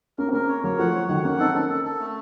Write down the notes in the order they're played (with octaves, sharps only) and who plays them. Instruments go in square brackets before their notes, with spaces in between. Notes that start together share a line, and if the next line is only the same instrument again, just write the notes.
[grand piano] A#3 C#4 [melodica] A#4
[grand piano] C4
[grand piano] A#3 C#4 [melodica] A#4
[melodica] C#5
[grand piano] F#3 A#3 [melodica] C#5
[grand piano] F3 A3 [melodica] F#5
[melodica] C#5
[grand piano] D#3 F#3 [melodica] F#5
[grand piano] A#3 C#4 [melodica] F#5
[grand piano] C4 D#4 [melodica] A4
[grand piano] A#3 C#4 [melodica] A4
[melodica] A4
A4
A3